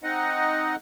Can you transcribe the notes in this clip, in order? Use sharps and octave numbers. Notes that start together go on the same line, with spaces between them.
C4 D#4 D#5 F#5